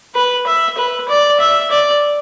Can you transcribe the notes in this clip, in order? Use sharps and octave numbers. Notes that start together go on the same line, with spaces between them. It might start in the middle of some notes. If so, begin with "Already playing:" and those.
B4
E5
B4
D5
E5
D5